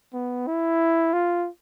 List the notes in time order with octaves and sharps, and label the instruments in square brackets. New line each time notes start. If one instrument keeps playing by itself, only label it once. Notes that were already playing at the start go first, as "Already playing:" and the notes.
[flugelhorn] B3
E4
F4